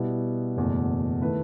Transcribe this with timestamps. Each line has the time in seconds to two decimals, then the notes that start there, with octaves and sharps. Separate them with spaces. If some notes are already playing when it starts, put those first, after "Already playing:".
Already playing: B2 G3 B3 E4
0.56 F#1 E2 B2 A3
1.21 D#3 A3 E4 B4